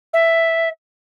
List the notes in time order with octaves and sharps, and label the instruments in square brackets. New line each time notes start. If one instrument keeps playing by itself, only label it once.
[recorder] E5